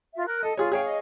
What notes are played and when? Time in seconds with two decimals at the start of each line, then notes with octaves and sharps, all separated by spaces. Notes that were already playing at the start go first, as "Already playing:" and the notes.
0.14 F4 E5
0.27 A#4 F#6
0.43 A4 D#5
0.57 F4 G#4 C#5
0.72 G#4 C#5 F5 G5
0.86 D#5